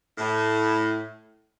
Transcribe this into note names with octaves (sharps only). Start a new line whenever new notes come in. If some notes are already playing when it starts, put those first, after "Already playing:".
A2